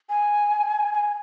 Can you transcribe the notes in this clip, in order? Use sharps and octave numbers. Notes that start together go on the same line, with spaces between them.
G#5
G#5